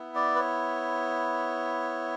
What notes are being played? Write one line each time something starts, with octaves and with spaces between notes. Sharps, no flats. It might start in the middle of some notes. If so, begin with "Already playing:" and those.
Already playing: B3 E4
D5
B4
C#5